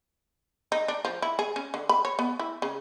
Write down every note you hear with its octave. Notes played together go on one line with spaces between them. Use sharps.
D#4
D4
F3
E4
G#4
C#4
D3
B5
C#5
B3
E4
C#3